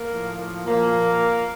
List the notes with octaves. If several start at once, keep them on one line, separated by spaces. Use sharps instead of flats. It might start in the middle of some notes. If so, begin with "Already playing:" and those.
Already playing: A#3
A2 F3
A#2 F3 A#3